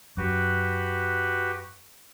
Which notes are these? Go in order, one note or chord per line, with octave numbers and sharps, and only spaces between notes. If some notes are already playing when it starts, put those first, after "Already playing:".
F#2 F#4 G4 B4